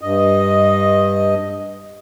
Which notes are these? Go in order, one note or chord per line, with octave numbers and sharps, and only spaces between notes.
G2 D#5